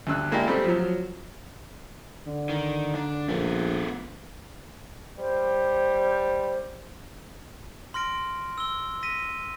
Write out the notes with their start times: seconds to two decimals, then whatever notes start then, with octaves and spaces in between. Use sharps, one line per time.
0.07 D2 G2 E6 F#6
0.31 G#3 A#3 E4 G4 D5 E5
0.47 G3 A3 C4
0.64 F3 F#3
2.26 D3
2.49 D#3
2.95 D4
3.29 A#1 A3 B3
5.18 G3 C5
7.94 C6 F6 A#6 D7
8.58 E6 G7
9.03 A#6 B6 D#7